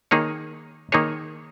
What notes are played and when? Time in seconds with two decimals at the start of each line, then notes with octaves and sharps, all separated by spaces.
0.11 D#3 A#3 D#4 G#4 C#5
0.92 D#3 A#3 D#4 G#4 C#5